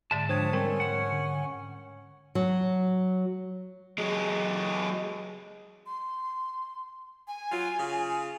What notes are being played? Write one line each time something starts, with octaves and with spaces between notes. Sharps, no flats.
G#2 D3 G#3 D5 E5 A5
F3 D4 C5 C#5 G5 D#6 G#6
G3 A3 C4 C#4 A#4 G5
G#2 F#5 C#6
D3
F#3
F#3 G#3
C6
G#5
F#3 F4
C#3 F4